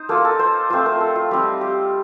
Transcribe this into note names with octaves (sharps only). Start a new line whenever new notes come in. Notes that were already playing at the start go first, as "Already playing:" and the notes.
Already playing: D#4 C5
A#3 F4 A4
A#4
A4
C5
A3 C4 F4 C5
A#4
A4
F4
G3 C4 D#4 G4
G4